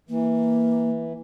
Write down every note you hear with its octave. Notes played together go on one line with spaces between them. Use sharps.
E3 A#3